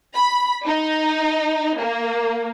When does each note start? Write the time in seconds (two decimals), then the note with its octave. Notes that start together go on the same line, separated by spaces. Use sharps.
0.14 B5
0.66 D#4
1.80 A#3